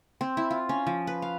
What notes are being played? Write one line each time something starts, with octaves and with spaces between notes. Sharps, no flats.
C4
E4
F4
C#4
F3
B4
F5